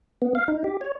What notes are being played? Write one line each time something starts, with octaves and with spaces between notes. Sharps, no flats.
B3
F5
D#4
G4
C#5